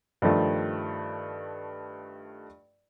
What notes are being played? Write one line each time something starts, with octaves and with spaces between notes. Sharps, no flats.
G2 D#3 F3 A3